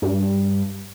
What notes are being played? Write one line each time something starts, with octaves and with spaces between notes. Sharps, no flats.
G2